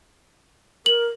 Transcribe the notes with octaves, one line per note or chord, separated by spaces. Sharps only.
A#4 F#7